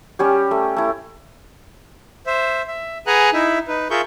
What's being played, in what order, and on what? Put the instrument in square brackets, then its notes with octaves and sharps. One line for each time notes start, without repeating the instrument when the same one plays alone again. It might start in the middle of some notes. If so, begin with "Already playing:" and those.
[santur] G3 C#4 G4
A3
A3 E4
[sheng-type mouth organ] C5 E5
E5
G#4 B4 F#5 G#5 A#5 F#6
D#4 E4 E5
D#4 B4
F4 G#4 A#4 E5 C#6 G6